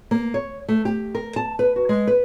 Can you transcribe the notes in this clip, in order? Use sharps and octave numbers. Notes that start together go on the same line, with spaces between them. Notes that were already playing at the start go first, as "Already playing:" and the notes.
A#3
C#5
A3
G4
A#4
A5
B4
F#4
G#3
B4